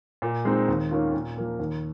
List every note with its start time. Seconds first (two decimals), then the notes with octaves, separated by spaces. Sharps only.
0.22 A#2
0.45 G#3 C4 D#4
0.68 D#2
0.91 D#3 A#3 C#4 F4
1.14 A#2
1.37 F3 A#3
1.59 D#2